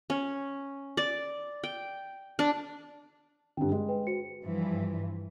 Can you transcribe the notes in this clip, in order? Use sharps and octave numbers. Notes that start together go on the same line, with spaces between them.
C#4
D5
G5
D4
G2 D3 G5
G#3
B4 G5
F#4 C5 C#7
G2 E3 F3